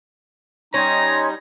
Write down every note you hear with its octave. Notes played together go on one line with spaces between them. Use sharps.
G3 C#4 D#4 A#5 C6 G#6